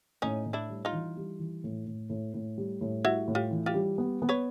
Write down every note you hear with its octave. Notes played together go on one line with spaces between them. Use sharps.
A2 C#4 D#4
A2
D4 E4
G3
D#4 F4
E3
G3
E3
A2
A2
A2
A2
G3
A2
G3 E4 F#4
A2
F4 G4
E3
F4 G4
G3
B3
B3
B4 C#5